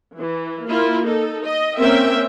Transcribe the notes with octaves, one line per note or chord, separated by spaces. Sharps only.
E3
A#3 E4 F4
D#4 A4
D#5
A#3 C4 C#4 A#4 E5 G5